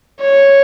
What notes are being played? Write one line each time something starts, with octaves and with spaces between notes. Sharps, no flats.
C#5